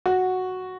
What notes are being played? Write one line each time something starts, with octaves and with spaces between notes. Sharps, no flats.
F#4